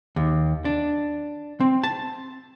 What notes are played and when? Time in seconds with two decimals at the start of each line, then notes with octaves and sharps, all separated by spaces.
0.16 D#2
0.65 D4
1.60 C4
1.83 A5